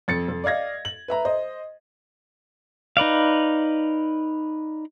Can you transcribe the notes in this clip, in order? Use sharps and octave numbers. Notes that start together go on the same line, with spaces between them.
F2 A6 C#7
F2
D5 D#5 F5 G#6 A#6
F#7
B4 E5 A#5
C5 D#5
D#4 B4 D5 F5